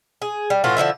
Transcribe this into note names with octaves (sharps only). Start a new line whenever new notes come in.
G#4
G3
A2 E3 F4 F#4
D3 E3 F3 E4